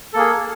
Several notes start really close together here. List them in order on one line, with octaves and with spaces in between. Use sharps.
A4 A#3 G#4